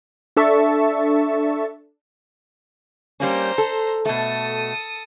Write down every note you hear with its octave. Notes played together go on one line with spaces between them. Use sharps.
D4 A4 E5 A5 C#6
G3 A#3 C#4 C5 A#5
A4
B2 A3 A4 D#6